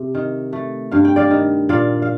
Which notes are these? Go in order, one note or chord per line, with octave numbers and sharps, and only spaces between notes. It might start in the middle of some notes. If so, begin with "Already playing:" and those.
Already playing: C3
D#3
A3
G2 F5
G5
D5 F5
D#3
A#2 D5 F5
F5